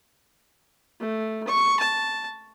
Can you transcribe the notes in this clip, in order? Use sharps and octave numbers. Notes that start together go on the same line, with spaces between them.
A3
C#6
A5